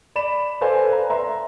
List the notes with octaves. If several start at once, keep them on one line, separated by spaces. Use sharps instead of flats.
D5 B5 E7
A4 B4 C5 D5 F5 G#5
B4 A#5
E5 A#5 C6